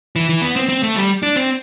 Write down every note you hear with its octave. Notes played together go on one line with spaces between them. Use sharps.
E3
E3
B3
C4
C4
A3
G3
D4
C4